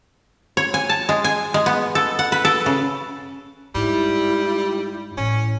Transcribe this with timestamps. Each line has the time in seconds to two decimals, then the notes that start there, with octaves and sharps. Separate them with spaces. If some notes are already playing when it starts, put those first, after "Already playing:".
0.57 C#5
0.74 G#5
0.89 A5
1.09 G#3
1.24 G#5
1.54 G#3
1.66 B3
1.95 A4
2.19 F#5
2.32 B4
2.45 A4
2.66 C#3
3.75 G#2 G3 E4
5.17 A1 C#4 E4